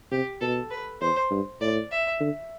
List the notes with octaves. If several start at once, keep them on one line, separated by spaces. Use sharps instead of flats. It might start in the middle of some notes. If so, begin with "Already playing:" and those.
C3 G4
B2 A4
B4
E2 C5
G2
A2 D5
E5
D3